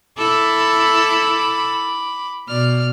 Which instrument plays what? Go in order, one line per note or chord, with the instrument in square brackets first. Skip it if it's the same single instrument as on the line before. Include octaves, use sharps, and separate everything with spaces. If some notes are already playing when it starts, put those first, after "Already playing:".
[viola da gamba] E4 A4 [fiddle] B5 D6
[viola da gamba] B2 [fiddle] D5 F6